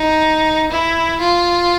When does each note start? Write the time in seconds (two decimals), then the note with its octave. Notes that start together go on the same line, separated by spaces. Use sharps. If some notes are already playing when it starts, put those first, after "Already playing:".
Already playing: D#4
0.71 E4
1.20 F4